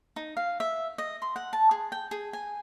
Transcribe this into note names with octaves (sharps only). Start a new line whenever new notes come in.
D#4
F5
E5
D#5
C6
F#5
A5
G#4
G5
G#4
G#5